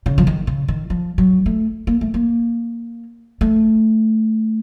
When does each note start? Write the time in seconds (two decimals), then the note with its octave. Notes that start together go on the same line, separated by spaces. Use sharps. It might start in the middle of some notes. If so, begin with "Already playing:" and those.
0.06 C#3
0.18 F3
0.27 D#3
0.47 C#3
0.68 D#3
0.90 F3
1.18 F#3
1.46 A3
1.87 A#3
2.01 A3
2.14 A#3
3.41 A3